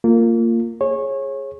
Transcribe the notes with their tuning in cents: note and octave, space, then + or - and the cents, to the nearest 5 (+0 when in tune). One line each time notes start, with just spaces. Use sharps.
A#3 -20 F4 -5
G#4 +0 C#5 -25